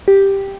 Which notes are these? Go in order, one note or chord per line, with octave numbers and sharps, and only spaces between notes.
G4